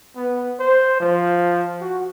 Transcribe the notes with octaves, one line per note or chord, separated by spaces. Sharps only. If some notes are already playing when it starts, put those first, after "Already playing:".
B3
C5
F3
F#4